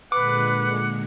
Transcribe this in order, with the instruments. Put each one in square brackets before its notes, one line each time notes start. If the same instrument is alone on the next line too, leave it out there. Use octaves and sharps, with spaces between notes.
[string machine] A#2 D3 G#3 [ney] B4 [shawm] F#5 [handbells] D6